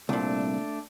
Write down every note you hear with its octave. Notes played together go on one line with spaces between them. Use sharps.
C2 A#2 A3 D4